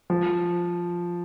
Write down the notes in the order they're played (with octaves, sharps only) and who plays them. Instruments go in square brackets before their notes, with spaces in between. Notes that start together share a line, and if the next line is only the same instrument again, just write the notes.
[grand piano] F3